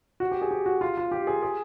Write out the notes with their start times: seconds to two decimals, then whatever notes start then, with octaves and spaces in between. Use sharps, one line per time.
0.20 F#4
0.31 G4
0.42 G#4
0.51 G4
0.66 F#4
0.81 F4
0.97 F4
1.11 G4
1.27 G#4
1.43 G#4